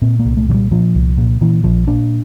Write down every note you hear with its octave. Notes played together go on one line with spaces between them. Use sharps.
A#2 C4
A#3
C2
A3
A#2 F3
G3
A#2 F3
C2
A#2
A#2 E3
A#1 F3
A#2 D4